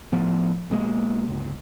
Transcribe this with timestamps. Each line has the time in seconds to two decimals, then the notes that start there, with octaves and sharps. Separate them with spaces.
0.12 A2 F3 B3
0.70 B1 B2 G#3 A#3
1.28 G1 C#2